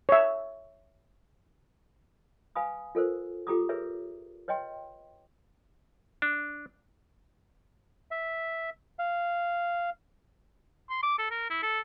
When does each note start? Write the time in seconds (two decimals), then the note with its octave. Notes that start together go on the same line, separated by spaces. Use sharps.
0.09 C#5 E5
2.56 B4 F5 G#5 B5 D#6
2.95 F4 A4 A#4 C5
3.47 F4 G4 A4 A#5 D6 D#6
3.69 G#4 A#4 B4 C#5 E5
4.48 B4 C#5 D#5 G5 C6
6.22 D4
8.11 E5
8.99 F5
10.90 C6
11.03 D6
11.18 A4
11.31 A#4
11.50 E4
11.63 A4